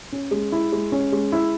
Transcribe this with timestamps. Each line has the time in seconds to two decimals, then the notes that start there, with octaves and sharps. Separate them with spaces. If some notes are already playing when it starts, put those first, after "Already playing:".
0.12 C#4
0.31 G#3
0.52 E4
0.72 G#3
0.92 C#4
1.12 G#3
1.32 E4